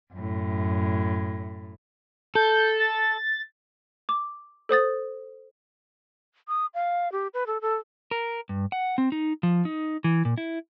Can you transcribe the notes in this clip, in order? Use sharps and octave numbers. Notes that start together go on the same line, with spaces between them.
F#2 A2
A4 G6
A6
D6
A4 C5 D#6 A6
D#6
F5
G4
B4
A4
A4
A#4
G2
F#5
C4
D#4
F3
D#4
E3
A#2
E4